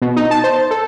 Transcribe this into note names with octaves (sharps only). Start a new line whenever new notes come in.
B2
D#4
A5
C5
A4